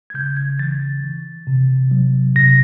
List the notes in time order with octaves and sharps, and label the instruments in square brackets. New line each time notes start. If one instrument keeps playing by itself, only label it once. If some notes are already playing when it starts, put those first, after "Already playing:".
[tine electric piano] G#6
C#3 G6
G#6
E3 A6
E3
C3
F#3
C3 A#6